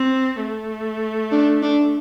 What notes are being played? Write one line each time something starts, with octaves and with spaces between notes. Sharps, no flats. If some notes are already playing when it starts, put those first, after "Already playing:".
Already playing: C4
A3
D4
D4